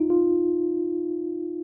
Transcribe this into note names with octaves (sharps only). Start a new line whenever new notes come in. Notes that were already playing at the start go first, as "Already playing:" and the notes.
Already playing: D#4 F4
F4